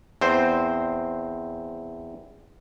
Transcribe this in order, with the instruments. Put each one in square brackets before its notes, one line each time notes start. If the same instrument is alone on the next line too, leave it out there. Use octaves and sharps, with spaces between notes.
[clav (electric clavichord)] E2 C4 C5